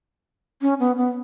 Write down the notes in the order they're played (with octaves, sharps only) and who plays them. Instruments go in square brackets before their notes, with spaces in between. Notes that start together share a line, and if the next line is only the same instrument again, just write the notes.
[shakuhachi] C#4
B3
B3